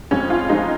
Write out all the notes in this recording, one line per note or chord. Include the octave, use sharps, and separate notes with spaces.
F2 F3 G#3 C#4
F4
F3 G#3 D#4